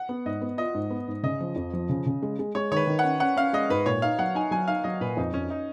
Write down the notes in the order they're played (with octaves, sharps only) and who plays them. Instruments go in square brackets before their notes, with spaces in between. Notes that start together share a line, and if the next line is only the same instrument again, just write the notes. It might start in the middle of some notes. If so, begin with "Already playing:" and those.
Already playing: [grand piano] F#5
[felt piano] B3
[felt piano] G#2 [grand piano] D#5
[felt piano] B3
[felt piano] F4 [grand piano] D#5
[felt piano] G#2
B3
G#2
[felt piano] C#3 [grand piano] D#5
[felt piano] F3
F2
F3
C#3
C#3
G#3
G#3
[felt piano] G#3 [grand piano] C#5
[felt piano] D#3 [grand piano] C#5
[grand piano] B4
[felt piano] D#3
[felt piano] C#4 [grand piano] F#5
[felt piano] C#4 [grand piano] F#5
[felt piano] C#4 [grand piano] F5
[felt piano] G#3 [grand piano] D#5
[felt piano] G#2 [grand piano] B4
[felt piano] A#2 [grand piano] C#5
[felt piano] D#4 [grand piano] F5
[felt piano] F#3 [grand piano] F#5
[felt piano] D#4 [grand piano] G#5
[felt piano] F#3 [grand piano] G#5
[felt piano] D#4 [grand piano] F5
[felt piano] F#3 [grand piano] D#5
[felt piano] A#2 [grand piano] B4
[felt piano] F2 [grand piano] D#4
[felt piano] F2 [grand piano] C#4
[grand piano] D#4